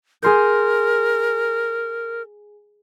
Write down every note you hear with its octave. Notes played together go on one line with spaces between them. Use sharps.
G#4 A#4 C6 G6